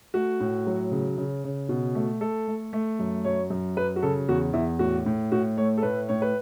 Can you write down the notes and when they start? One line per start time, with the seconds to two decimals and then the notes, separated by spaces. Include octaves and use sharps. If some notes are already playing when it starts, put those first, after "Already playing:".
0.14 A3 F#4
0.40 A2
0.67 F#3
0.91 C#3
1.18 C#3
1.44 C#3
1.69 B2
1.95 A3
2.21 A3 A4
2.48 A3
2.73 A3
2.99 F#2
3.24 F#2 C#5
3.50 F#2
3.77 F#3 B4
3.96 F#4
4.02 C#3 A4
4.29 E2 F#4
4.53 E2 E4
4.79 A2 F#4
5.06 A2
5.32 A2 F#4
5.57 A3 C#5
5.78 A4
5.83 A2 B4
6.09 A2 C#5
6.22 B4